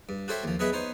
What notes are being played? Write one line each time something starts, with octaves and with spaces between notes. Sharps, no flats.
G2
F#4 G4 A4 C5 C#5 E5
D#2 F3
F#3 B3 G#4 B4 D#5 E5
B3 D#4 C5 C#5